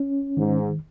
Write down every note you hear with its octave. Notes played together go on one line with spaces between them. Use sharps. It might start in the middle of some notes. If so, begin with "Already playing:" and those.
Already playing: C#4
G#2 D#3